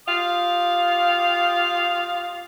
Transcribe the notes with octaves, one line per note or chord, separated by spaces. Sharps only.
F4 G4 D#5 F5